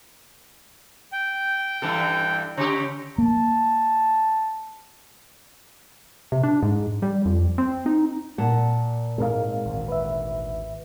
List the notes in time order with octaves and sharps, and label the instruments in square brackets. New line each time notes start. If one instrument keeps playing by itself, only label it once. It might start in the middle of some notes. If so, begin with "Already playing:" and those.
[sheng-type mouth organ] G5
[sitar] G2 E3 A4
[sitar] C#3 G4 [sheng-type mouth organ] C#5 A#5
[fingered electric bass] A#3 [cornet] A5
[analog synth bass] C3
D4
G#2
G3
F2
C4
D#4
[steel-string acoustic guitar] A#2 F#5 A5
[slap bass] G#2 G#3 [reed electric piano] C4 A#4 F5
[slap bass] G#1 D2
[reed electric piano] B4 E5